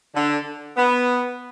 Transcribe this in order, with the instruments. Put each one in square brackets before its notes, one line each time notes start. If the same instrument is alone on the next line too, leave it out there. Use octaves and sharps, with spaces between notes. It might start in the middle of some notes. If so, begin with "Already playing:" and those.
[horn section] D3
B3